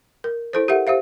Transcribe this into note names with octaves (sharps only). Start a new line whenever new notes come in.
A#4
E4 A4 C5
G4 A4 A#4 E5 F#5
G4 C5 E5 F5